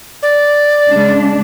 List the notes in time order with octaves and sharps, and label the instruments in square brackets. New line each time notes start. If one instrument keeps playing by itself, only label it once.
[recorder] D5
[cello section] C#3 G#3 D4